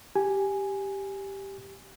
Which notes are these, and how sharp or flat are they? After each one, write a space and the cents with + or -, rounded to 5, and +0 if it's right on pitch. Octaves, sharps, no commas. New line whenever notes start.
G4 +0 G#5 +0